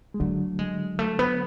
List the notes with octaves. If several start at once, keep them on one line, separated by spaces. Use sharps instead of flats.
G#3
D3 F#3 A3
G#3
A3
B3